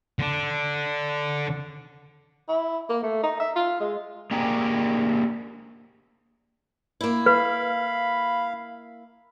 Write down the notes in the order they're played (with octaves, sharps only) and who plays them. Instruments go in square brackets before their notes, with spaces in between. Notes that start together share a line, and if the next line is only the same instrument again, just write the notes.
[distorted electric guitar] D3 D4
[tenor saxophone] E4
A#3
A3
D#4
E5
F4
G#3
[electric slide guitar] A#3 D4 G4 G#4 A#4
[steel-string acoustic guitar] A#3 E4
[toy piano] B4 [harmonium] F5 [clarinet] B5